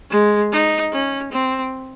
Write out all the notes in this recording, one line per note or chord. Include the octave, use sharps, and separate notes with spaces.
G#3
D#4
C#4
C4